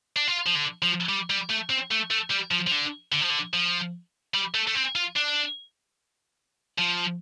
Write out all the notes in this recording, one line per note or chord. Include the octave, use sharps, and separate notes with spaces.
D4
F4
F3
D3
F3
G3
G3
A3
C4
A3
A3
G3
F3
F3
D3
D3
F3
D3
F3
G3
A3
A3
C4
F4
D4
F3